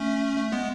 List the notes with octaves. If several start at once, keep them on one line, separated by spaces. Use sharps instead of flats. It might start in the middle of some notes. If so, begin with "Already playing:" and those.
Already playing: A3 C#4
A3
G#3 B3